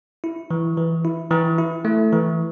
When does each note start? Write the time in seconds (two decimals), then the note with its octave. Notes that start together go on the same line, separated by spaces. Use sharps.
0.24 E4
0.51 E3
0.77 E3
1.05 E4
1.31 E3
1.58 E4
1.85 A3
2.12 E3